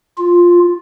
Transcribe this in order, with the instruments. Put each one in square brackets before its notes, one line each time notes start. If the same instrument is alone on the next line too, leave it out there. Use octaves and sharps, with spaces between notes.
[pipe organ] F4